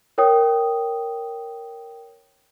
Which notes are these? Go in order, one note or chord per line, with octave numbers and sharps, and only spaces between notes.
A#4 C#5 G5 D#6